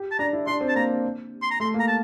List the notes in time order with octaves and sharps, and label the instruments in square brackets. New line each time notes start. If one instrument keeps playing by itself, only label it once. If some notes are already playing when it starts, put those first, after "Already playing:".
Already playing: [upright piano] G4
[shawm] A5
[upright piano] D4 [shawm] A#5
[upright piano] E4
[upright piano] D4 [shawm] C6
[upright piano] C4
[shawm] A5
[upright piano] A#3 [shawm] A#5
[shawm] C6
A#5
[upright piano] A3 [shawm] C6
[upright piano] A#3
[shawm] A#5
A5